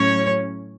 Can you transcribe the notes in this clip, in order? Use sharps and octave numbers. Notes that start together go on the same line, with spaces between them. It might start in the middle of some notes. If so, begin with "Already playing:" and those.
Already playing: A2 F#3 C#4 C#5